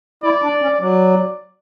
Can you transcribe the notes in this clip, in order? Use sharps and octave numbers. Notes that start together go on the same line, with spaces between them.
E4 D5
D4
C#4
F#3 D5